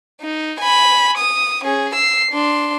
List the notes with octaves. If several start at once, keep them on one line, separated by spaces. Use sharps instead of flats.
D#4
G#5 B5
D#6
C#4 G#4
E6 C7
D4 C6